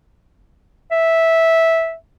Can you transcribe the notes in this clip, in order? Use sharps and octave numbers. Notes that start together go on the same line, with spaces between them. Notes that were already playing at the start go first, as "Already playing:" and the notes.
E5